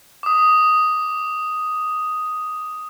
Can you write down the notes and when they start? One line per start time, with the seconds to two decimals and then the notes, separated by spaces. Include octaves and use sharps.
0.23 D6 D#6